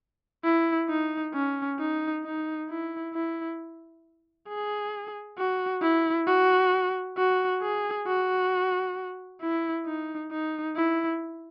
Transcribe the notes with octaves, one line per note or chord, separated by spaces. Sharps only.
E4
D#4
C#4
D#4
D#4
E4
E4
G#4
F#4
E4
F#4
F#4
G#4
F#4
E4
D#4
D#4
E4